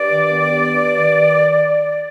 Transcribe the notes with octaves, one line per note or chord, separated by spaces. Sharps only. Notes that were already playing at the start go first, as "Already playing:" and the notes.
Already playing: G2 D5
D#3
B3
G2
G2
D#3